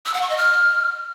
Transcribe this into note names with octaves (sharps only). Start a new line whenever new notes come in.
E6
F#5
C#6
D#5
F6